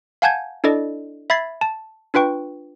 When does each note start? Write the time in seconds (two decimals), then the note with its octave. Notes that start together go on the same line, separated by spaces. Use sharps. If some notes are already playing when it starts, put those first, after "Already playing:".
0.22 F5 F#5 G#5 A5 G6 G#6
0.64 D4 E4 A4 D5 D#5
1.30 E5 B5 G#6 A6 C7
1.61 A5
2.14 D4 F4 B4 G5 C#6